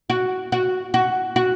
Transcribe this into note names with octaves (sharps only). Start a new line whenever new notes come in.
F#4
F#4
F#4
F#4